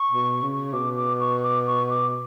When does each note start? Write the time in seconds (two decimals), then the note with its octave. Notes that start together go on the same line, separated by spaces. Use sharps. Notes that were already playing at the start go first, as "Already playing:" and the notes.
Already playing: C#6
0.11 B2
0.42 C#3
0.73 B2 D6
0.97 D6
1.20 C#6
1.43 D6
1.67 C#6
1.89 D6